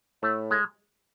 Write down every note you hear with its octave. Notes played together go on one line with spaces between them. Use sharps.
A2 A3
G#3